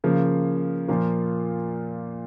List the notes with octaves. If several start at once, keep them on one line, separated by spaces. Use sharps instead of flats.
C#3 F3 A#3
A#2 F3 A#3 F4